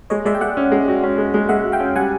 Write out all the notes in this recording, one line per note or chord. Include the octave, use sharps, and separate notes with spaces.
G#3 C#5 D#5
G#3 D5 E5
G5
G#3 E5 F#5
C#4
G#3
F#4
C#4
G#3
G#3
G#3 E5 F#5
F#4
F5 G5
C#4
G3 F#5 G#5